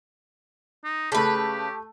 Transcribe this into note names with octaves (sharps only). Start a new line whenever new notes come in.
D#4
C#3 A3 G4 B4 A5